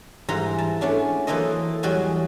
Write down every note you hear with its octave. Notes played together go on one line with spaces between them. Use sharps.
G#2 E3 G3 C5 A#5
A5
A3 B3 C#4 D4
E3 F#3 A#3 A4 C5 D#5
E2 F#3 G3 F#4 D#5 G#5